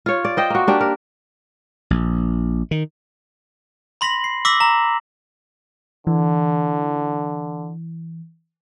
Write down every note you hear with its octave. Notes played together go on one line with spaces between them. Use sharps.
F4 C#5
D5
C5 D#5 G5
A#3 F#4
A#3 D4 G4
A#4
A#1
D#3
B5 C6 A#6 B6 F#7
C7
D6 E6 A#6 B6 F#7
A#5
D3 E3